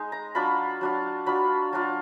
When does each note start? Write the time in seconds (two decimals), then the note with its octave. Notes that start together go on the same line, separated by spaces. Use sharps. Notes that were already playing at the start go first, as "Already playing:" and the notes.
Already playing: G#3 D#4
0.12 A#5
0.35 F#3 D4 F4 B5
0.81 F#3 D4 F4
1.26 F#3 D4 F4 B5
1.73 F#3 D4 F4